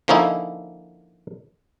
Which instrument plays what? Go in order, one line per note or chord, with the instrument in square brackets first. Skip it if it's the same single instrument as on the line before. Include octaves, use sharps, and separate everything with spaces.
[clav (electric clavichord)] D3 F3 A#3 C#4 D#4 E4